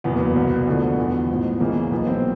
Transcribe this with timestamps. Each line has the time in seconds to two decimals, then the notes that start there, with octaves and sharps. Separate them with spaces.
0.04 F#1 E2 B2 B3
0.14 A#3
0.25 B3
0.36 C2 B2
0.67 D2 D3 F3
0.98 E2 B2 B3
1.29 A1 G#2 F3
1.60 C#2 C#3 E3 A#3
1.91 B1 A#2 F3 B3
2.07 C4